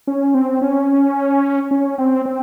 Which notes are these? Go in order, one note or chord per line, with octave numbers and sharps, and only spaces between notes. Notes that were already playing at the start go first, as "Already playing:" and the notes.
C#4
C4
C#4
C#4
C4
C4